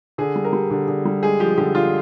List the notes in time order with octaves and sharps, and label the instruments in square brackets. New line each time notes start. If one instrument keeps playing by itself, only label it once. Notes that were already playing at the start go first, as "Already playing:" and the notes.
[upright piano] D3 G#4
G3
A#4
G3
D3
D3
G3
G#3 G#4
F3 G4
D3 G4
D3 F4